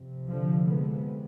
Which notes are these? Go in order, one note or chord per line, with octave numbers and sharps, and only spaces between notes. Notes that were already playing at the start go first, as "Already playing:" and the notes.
Already playing: F2 C3
D3 F3
G#3 B3